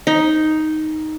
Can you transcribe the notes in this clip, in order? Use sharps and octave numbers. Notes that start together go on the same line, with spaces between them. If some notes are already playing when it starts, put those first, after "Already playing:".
D#4